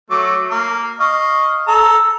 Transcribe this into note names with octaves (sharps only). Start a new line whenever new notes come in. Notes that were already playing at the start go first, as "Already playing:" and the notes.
F#3 A3 D6
A#3
D#5 F5 C#6
A4 A#5 E6